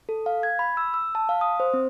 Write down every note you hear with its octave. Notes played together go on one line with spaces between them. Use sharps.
A4
F5
G#6
B5
E6
E6
A5
F5
D#6
C5
C4